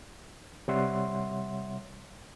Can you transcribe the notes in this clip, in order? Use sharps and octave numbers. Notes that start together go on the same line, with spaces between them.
C3 G3 C#5 E5 F#5 C6